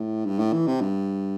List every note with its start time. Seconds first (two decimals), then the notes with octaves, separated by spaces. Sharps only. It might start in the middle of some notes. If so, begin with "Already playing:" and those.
Already playing: A2
0.25 G2
0.39 A2
0.53 E3
0.67 C3
0.81 G2